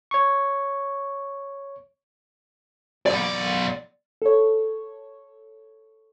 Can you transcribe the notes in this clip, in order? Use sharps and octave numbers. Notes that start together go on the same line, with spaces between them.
C#5 C#6
B1 D5
A4 C#5